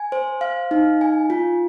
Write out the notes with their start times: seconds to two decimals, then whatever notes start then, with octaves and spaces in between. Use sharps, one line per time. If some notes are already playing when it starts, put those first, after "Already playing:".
Already playing: G#5
0.12 C5
0.41 F5
0.71 D#4
1.01 G#5
1.30 F4